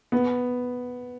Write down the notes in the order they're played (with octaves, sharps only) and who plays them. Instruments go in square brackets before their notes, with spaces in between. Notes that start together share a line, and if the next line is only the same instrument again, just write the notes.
[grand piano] B3